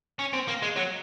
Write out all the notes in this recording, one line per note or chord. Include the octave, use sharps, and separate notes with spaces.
C#4
C4
A#3
G#3
F#3